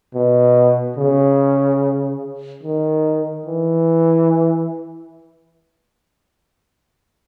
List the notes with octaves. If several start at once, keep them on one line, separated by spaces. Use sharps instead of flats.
B2
C#3
D#3
E3